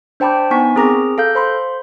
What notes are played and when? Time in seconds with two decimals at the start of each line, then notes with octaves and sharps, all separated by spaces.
0.20 D4 C5 G5 A5 B5 D6
0.51 B3 D#4 G#5 C#6 B6
0.76 C4 G#4 A#4 A#5 D6 A#6
1.18 A4 F5 G6
1.35 C5 B5 C6